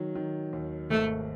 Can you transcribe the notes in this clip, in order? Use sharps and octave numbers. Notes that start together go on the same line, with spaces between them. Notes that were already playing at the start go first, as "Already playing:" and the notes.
Already playing: D#3 F#3
D#3
D#2
G#1 A3